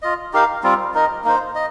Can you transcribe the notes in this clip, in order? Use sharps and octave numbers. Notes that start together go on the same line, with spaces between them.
F4 D#5
D#4 G4 A#4 F5
G3 C4 F4
D#4 A#4 D#5
A#3 D#4 C5
D#5